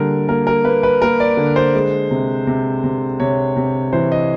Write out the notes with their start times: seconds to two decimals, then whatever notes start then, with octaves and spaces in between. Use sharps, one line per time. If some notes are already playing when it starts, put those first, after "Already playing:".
Already playing: D3 G3 A#3 A#4
0.28 A#3 A#4
0.47 A#4
0.64 A#3 B4
0.83 B4
1.02 A#3 A#4
1.20 D5
1.37 D3
1.56 C5
1.74 G#3
2.11 C3
2.47 C3
2.84 C3
3.20 C3 C#5
3.56 C3
3.93 E3 C5
4.12 D#5